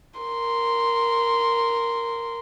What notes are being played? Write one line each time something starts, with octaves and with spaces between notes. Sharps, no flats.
A#4 C6